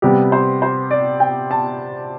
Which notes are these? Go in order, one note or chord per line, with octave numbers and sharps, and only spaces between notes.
C3 G3 B3 G4
C5
C5
D5
G5
A5